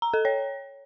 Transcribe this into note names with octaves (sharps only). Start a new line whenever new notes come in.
A#5
A4
C#5